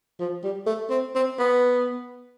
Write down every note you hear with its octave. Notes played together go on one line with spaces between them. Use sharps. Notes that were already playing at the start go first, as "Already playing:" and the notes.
F3
G3
A3
C4
C4
B3